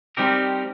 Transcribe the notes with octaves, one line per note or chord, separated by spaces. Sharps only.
G3 C4 D#4 G4 A#4